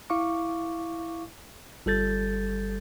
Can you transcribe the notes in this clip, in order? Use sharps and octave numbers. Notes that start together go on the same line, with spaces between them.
E4 F5 C#6 D6
G1 G3 A4 G6 A6